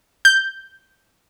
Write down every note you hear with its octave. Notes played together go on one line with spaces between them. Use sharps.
G6